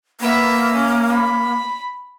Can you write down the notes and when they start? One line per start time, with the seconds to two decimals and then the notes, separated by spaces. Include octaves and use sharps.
0.20 A#3 B3 E5
0.73 C#4
1.12 B5